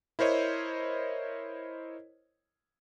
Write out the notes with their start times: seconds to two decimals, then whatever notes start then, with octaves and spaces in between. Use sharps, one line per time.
0.19 E4 A#4 C5 C#5 D#5